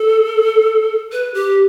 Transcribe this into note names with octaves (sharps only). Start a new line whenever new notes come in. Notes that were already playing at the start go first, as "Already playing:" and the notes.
Already playing: A4
B4
G4